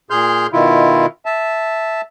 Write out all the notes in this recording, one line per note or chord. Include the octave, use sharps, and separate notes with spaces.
A#2 G#4 C6 F6 G6
B2 D#3 E4 F4
E5 A5